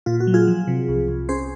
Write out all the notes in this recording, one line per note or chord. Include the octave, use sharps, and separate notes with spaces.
A#2 F4
F#4
F#3
F4 G#4
F3
C3
C2
C2
C#4 G#4 C5